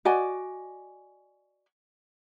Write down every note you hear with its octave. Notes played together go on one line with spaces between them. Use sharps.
F#4 D5 D#5 G#5